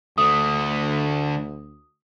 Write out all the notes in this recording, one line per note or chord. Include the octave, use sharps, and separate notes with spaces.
D2 D3 A3 D#6